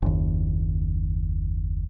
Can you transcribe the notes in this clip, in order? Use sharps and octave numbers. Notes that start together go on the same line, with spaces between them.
F#1 D#2